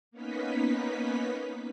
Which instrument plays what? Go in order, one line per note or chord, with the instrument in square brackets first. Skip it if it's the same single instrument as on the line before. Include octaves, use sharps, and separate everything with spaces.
[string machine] A#3 B3 C#4 D#4 B4 B6